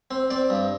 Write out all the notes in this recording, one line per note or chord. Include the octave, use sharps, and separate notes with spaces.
C4
C4 D5
G2